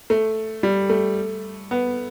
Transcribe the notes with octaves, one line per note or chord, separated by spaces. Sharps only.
A3
G3
A3
B3